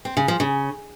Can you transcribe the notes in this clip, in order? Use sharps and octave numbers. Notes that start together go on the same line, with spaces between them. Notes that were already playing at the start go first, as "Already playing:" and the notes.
C4
C#3
F3
C#3